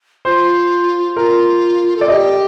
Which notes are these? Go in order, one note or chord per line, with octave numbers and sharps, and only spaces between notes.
F4 C5
F4 A#4
A4 D5
G4 A4 D#5